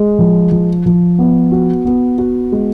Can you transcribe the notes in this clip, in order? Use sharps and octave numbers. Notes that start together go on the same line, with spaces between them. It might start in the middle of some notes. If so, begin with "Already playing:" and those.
Already playing: G#3
F3
F3
F3
B3
F#4
B3
F#4
G#3